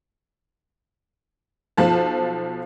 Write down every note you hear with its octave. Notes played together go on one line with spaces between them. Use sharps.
B1 F3 F4 A5